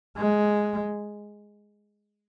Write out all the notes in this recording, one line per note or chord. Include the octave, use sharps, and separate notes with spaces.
G#3